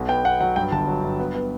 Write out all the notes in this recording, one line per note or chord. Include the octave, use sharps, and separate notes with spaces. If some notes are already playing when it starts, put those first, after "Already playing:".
Already playing: B1 B2
B3 G5
B3 F#5
F#3 F#5
G2 G5
G1 A5
F#3
G2
B3
B3